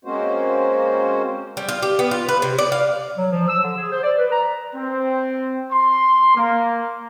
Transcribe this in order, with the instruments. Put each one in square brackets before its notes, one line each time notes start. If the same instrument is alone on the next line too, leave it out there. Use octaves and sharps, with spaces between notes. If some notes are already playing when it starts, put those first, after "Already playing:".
[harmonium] G#3 A#3 C4 C#4 F#4 C5
[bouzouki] G3
F4
G4
B3
F4
B4
C3
D5
F5
[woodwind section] F#3
F3
E6
D3
G#4
C5
D5
B4
A#5
[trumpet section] C4
C6
A#3